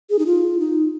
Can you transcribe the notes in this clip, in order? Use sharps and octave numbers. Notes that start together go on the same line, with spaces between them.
G#4
D#4
F4
D#4